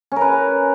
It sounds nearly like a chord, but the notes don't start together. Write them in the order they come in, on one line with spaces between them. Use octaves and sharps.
C#4 A#4 B4